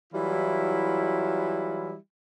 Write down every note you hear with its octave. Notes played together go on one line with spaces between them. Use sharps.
E3 F#3 G3 E4 F4